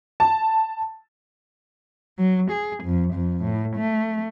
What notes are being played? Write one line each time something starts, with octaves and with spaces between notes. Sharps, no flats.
A5
F#3
G#4
F2
F2
A2
A3